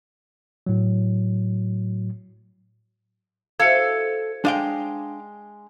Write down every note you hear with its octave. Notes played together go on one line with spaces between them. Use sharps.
A2 F#3
C4 E4 F#4 A4 F5 G#6 C#7
G#3 D4 F5 G5